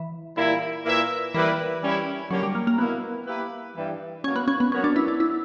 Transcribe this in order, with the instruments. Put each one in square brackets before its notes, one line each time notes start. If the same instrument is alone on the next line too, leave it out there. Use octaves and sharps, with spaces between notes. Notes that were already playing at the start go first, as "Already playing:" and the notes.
Already playing: [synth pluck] E3
[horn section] A#2 G3 A#3 E4
A#2 A#3 E4 B4 E5
[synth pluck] E3 [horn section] G3 A#3 E4 B4 D5
[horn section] G3 C#4 E4
[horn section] D3 A#3 C#4 G4 C#5 [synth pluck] F#3
[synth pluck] G3
A#3
A#3
[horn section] B2 A#3 E4 [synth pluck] B3
[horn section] A#3 E4 G4 B4
G2 E3 G3
[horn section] B2 F#3 A#3 [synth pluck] C#4
[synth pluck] B3
C#4
B3
[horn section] F#3 B3 F#4 A#4 C#5 [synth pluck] C#4
[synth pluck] D4
E4
D4
E4